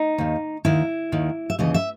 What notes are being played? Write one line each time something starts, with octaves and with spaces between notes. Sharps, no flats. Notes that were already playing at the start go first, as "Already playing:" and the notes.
Already playing: D#4
D#2 D#3
D#2 D#3 E4
D#2 D#3
E5
D#2 C#3 E3 D#5
E5